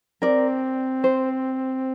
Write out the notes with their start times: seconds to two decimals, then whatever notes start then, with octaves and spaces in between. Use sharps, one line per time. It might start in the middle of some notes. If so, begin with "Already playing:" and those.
0.22 C4 A#4 D5
1.04 C5